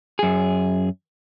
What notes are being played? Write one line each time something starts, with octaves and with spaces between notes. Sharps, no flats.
F#2 G#4